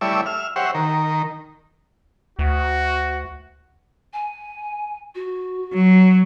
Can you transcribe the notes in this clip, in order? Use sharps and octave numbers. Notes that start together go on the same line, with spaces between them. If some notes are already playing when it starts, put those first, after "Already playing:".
G3 A3 E4 C#5 D5 E5
E5 F6
G4 C5 C#5 E5 F#5
D#3 A#4
D2 F#4
G#5
F#4
F#3